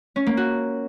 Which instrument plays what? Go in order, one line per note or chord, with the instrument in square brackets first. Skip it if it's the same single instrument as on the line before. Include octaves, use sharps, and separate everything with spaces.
[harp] C#4
A#3
F#4